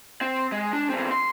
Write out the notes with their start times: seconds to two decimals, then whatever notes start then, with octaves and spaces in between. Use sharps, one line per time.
0.21 C4
0.52 G#3
0.73 D4
0.90 E2 C4
1.11 C6